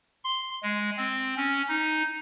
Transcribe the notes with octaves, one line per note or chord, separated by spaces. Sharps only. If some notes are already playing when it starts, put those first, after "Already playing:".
C6
G#3
C4
C#4
D#4